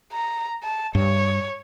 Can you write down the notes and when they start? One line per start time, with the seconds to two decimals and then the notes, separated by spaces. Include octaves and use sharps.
0.12 A#5
0.63 A5
0.95 G2 C#5